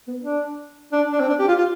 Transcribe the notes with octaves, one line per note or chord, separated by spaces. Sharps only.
B3
D4
D4
D4
C4
D4
G4
F4
F4